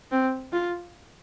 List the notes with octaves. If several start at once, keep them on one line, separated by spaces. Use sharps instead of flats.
C4
F4